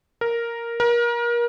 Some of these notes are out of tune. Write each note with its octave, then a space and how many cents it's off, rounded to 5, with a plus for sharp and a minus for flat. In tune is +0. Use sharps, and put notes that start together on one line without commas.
A#4 +0
A#4 +30